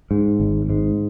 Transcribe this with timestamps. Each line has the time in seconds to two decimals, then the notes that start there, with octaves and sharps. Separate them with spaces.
0.11 G#2
0.39 G#1
0.70 G#2